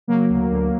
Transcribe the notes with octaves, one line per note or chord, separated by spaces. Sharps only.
C#3 F#3 A#3
D2
D2